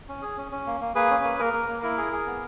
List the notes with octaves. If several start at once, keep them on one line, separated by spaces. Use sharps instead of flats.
C#4
G#4
C#4
C#4
A#3
A#3
A#3 G#4 B4
C#4
A#3
A#3 A#4
A#3
A#3
E4 A#4
G#4
G#4
B3